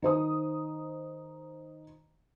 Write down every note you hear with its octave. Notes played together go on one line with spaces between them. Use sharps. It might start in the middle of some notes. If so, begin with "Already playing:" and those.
D#3 C5 D#6